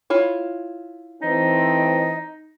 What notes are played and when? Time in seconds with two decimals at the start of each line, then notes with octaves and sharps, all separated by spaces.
0.10 E4 F4 C#5
1.22 E3 A3 C4 D#4 D#5